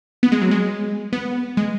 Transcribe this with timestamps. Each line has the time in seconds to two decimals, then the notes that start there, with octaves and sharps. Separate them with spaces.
0.23 B3
0.32 G#3
0.41 F#3
0.51 G#3
1.13 B3
1.57 G#3